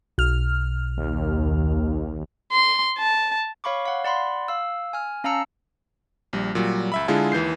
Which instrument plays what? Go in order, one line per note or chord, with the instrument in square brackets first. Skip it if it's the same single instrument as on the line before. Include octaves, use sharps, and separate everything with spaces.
[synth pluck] B1 F6
[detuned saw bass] D#2
[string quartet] C6
A5
[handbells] C#5 F5 B5 C#6 D6
F5 F#5
D5 F#5 B5 C6
F5 E6
G#5 F6
C#4 F5 A5 A#5 E6 C#7
[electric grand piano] A#1 G3
A#2 F#3 G3
C#2 E5 B5
D3 G#3 E4 F4 G#4 A4
D#2 E3 G6 C7